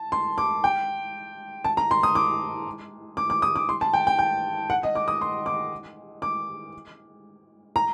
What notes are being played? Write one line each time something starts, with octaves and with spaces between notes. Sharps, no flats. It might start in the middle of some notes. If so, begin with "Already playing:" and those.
Already playing: A5
C6
D6
G5
A5
A#5
C6
D#6
D6
D6
D6
D#6
D6
C6
A5
G5
G5
G5
F#5
D#5
D6
D#6
C6
D6
D6
A#5